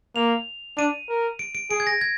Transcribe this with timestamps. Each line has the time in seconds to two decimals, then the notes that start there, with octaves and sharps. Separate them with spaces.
0.16 A#3 F7
0.77 D4 D#7
1.09 A#4
1.39 D7
1.55 D7
1.71 G#4 D7
1.80 G#6
1.87 A#6
2.01 G#6